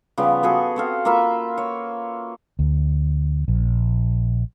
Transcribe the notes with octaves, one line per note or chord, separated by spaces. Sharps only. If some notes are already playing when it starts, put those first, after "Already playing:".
C#3 F3 G3 B3
B3 F#4 G#4 A4
C4 A4 F5
A#3 F4 E5 B5
C#5
D2
A#1